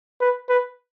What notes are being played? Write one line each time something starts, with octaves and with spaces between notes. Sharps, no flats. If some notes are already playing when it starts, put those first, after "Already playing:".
B4
B4